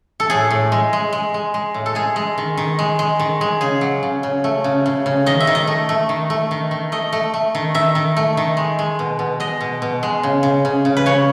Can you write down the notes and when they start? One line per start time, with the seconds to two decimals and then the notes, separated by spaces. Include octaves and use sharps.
0.20 A4
0.30 A2 G#4
0.50 A2
0.72 G#3
0.93 G#3
1.13 G#3
1.34 G#3
1.54 G#3
1.74 A2
1.86 A4
1.95 G#3 G#4
2.16 G#3
2.38 D#3
2.57 D#3
2.79 G#3
2.99 G#3
3.19 D#3
3.41 G#3
3.61 C#3 G#4
3.81 F#3
4.03 C#3
4.23 C#3
4.44 A3
4.64 C#3
4.86 C#3
5.06 C#3
5.26 D#3 D#5
5.40 E5
5.47 D#3
5.55 D#5
5.67 A3
5.89 A3
6.09 D#3
6.30 A3
6.51 D#3
6.71 D#3
6.92 A3 D#5
7.13 A3
7.34 A3
7.55 D#3
7.75 D#3 E5
7.95 D#3
8.16 A3
8.37 D#3
8.57 G#3
8.79 G#3
8.99 B2
9.19 B2
9.40 G#3 D#5
9.61 B2
9.82 B2
10.03 G#3
10.23 C#3
10.43 C#3
10.65 C#3
10.85 C#3
10.97 B4
11.06 C#3 C#5